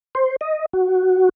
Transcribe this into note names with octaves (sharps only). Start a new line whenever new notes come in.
C5
D#5
F#4